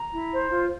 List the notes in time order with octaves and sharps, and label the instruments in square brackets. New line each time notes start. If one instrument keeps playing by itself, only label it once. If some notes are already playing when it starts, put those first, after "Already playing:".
Already playing: [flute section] A#5
E4
C5
F4